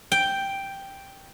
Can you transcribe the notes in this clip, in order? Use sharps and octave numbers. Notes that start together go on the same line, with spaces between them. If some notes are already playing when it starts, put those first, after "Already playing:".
G5